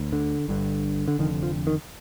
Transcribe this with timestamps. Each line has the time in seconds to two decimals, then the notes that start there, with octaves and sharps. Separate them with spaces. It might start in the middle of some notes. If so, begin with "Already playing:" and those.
Already playing: D2
0.13 D3
0.49 G1 G2 D3
1.08 D3
1.19 F1 F2 D3 D#3
1.43 F3
1.67 D#3